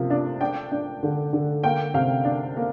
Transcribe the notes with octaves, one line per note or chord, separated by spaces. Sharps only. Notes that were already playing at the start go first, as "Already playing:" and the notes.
Already playing: C3 F3 A#3
D4
D4 G5
D4
D3
D3
A#3 G5
C3 F5
D4
A#3